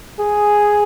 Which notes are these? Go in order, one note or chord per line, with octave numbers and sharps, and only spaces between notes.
G#4